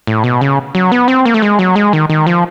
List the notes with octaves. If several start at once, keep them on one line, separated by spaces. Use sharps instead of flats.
A2
B2
C#3
F#3
B3
C4
A#3
A3
G#3
F#3
G#3
D#3
D#3
F3